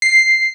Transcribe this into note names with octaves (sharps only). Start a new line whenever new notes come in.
C7